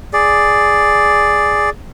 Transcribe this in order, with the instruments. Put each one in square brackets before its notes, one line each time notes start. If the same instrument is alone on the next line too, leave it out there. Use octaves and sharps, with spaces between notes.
[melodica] G#4 D5